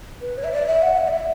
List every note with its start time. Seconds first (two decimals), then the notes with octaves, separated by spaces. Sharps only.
0.22 B4
0.38 C#5
0.44 E5
0.53 D5
0.67 E5
0.83 F#5
0.97 E5
1.08 D5
1.12 E5